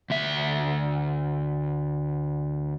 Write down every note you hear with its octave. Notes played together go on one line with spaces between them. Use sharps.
D2 E5